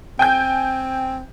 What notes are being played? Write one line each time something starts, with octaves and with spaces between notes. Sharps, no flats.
C4 G5 G#5 G6